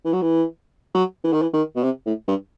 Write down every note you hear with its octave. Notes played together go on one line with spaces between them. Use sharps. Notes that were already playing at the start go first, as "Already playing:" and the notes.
E3
F#3
E3
F#3
E3
D#3
E3
D#3
B2
C3
A2
G2